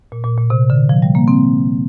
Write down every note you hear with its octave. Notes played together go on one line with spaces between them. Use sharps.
A#2
A#2
A#2
C3
D3
F3
G3
A#3
C4